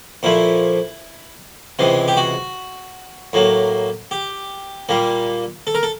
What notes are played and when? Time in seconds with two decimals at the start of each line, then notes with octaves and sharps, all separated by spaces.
0.23 A#2 F3 A3 E4
1.79 C#2 C3 E3 G#3
2.08 G4
2.17 F#4
3.33 A2 F#3 A#3
4.11 G4
4.89 A#2 G3 A#3
5.67 A4
5.75 A#4
5.83 A4